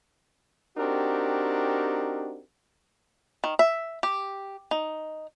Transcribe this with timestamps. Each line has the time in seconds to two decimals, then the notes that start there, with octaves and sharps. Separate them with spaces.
0.77 C4 D4 D#4 F#4 G4 A#4
3.44 D#3
3.59 E5
4.03 G4
4.71 D#4